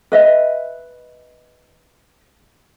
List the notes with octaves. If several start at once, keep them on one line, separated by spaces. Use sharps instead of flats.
B4 D#5 E5